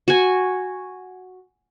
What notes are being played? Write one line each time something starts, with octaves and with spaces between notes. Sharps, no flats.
F#4 G#5